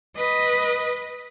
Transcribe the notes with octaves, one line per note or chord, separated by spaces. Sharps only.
B4 D#5